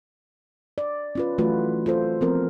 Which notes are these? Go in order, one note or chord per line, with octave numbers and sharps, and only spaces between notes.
D5
C#4 F4 B4
E3 F#3 A3 F4 F#4 B4
F4 A4 C5
F3 B3 C4 A#4